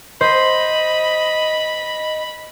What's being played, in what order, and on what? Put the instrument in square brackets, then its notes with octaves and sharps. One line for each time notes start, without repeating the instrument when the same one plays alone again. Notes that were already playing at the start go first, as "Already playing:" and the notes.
[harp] C5 [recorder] D#5 [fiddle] B5